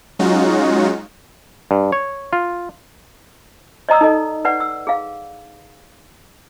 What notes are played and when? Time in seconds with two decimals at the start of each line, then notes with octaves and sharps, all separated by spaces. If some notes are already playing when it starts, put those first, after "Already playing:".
0.19 F#3 G#3 C#4 D#4 F4 F#4
1.71 G2
1.92 C#5
2.33 F4
3.89 D5 D#5 A#5 D#6 E6
4.01 D#4 A4 D#5
4.45 B4 D5 F#5
4.60 E6
4.87 G#4 F5